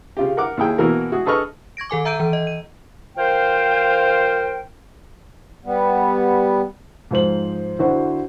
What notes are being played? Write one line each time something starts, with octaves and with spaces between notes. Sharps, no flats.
C#3 F4 G4
A#4 F#5 D6
D#2 E4 G#4 G5
B2 E3 A#3 E4 F#4 A#4
G#3 F#4 G#4
G#4 A4 B4 D#5 C#6 F6
C#6 G#6 A#6 D7
D#3 A4 G#5 D6
E5 A#5 E6 G6 D7 D#7
E3
D#5
D#7
F3 A#4 C5 F5 G5
G3 B3
G#2 F3 C5 F#7
D3 E4 F#4 C5